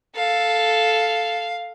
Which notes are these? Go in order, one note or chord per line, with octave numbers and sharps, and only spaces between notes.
A4 F5